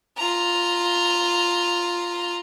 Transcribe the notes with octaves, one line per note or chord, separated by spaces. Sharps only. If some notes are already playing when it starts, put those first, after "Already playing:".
F4 A#5